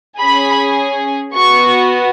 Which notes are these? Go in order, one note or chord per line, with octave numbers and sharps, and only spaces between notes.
C#4 G#4 B5
B3 F#4 C#6